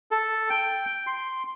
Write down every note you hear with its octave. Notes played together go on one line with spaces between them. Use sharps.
A4
G5
C6